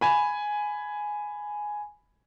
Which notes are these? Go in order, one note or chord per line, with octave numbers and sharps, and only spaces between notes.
G#5 B5